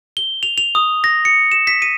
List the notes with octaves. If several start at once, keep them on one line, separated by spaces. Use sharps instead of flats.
G7
F7
F7
D#6
A#6
C#7
E7
B6
D#7